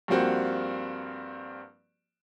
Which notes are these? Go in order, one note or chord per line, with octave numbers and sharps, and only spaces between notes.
G2 F3 G3 A#3 C4 F#4